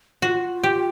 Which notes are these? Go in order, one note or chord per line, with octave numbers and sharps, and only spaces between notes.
F4 F#4
G4